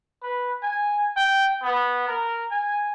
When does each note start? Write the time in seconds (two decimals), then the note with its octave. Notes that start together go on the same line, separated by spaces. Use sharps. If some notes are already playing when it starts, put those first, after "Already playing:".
0.23 B4
0.62 G#5
1.17 G5
1.62 B3
2.08 A#4
2.51 G#5